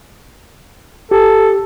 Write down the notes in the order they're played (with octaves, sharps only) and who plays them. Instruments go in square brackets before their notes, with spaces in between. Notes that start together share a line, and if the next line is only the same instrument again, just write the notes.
[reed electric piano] G4 [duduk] A4